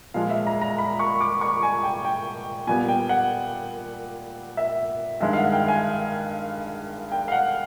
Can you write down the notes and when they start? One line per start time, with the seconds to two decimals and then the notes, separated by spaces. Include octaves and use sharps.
0.14 A#2 F3 G#3 F5
0.30 E5
0.46 A#5
0.61 A#5
0.78 B5
0.99 C#6
1.21 D6
1.41 C#6
1.63 G#5
1.83 G5
2.05 G5
2.67 A#2 G3 B3 G#5
2.88 G5
3.09 F#5
4.57 E5
5.20 G2 D#3 G#3 E5
5.33 F5
5.37 F#5
5.53 G5
5.68 G#5
7.12 G5
7.28 F5
7.32 F#5